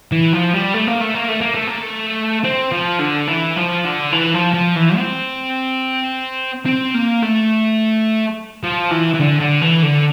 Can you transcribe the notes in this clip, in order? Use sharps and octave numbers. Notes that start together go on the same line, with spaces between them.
E3
F3
G3
A3
A#3
A3
A#3
A3
A#3
A3
A#3
A3
C4
F3
D3
E3
F3
D3
E3
F3
F3
E3
C4
C4
A#3
A3
F3
E3
E3
D3
D3
E3
D3